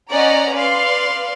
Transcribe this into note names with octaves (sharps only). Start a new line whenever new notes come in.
C#4 D5 D#5 F#5 A#5
B4 D5 F5 C6